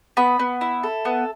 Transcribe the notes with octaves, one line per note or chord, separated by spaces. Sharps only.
B3 B5
B3
E4
A4
B3